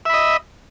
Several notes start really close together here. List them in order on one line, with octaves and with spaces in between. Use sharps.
E5 B5 D#5